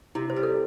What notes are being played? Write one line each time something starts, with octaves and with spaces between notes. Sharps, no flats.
C3 E4
C5
G3
A4